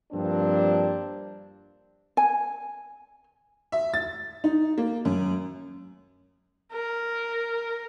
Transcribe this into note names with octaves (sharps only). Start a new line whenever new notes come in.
G2 F3 A#3 C4 D4
G#5
E5
A6
D#4
A#3
F#2
A#4